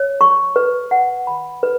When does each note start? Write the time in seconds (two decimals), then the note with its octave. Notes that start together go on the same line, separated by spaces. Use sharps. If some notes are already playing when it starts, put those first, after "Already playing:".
Already playing: C#5
0.21 C#6
0.56 B4
0.91 F#5
1.27 B5
1.63 B4